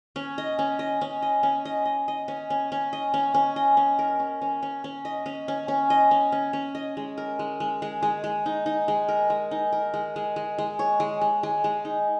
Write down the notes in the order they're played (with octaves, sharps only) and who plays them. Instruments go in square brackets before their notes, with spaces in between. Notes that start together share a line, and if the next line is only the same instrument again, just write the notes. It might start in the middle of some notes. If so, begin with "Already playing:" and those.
[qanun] C#4
D#5
C#4
D#5
C#4
D#5
C#4
D#5
D#5
D#5
C#4
C#4
C#4
D#5
C#4
C#4
D#5
C#4
A#4
C#4
C#4
C#4
C#4
D#5
C#4
C#4
C#4
D#5
C#4
C#4
C#4
D#5
G#3
A#4
G#3
G#3
G#3
G#3
G#3
D#4
D#4
G#3
A#4
G#3
D#4
A#4
G#3
G#3
G#3
G#3
C#5
G#3
G#3
G#3
G#3
D#4